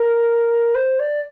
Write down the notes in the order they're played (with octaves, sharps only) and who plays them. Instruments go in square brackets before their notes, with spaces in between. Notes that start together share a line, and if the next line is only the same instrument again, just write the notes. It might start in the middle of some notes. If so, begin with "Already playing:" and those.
Already playing: [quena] A#4
C5
D5